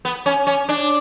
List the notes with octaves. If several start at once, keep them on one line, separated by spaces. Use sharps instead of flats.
B3
C#4
C#4
D4